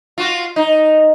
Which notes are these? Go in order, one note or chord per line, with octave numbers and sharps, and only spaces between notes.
F4 F#4
D#4